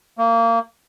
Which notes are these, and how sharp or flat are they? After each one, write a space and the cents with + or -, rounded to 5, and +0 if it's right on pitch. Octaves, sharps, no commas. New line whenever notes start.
A#3 -25